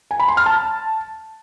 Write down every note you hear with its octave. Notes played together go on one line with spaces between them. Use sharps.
G#5
B5
C6
F6
A5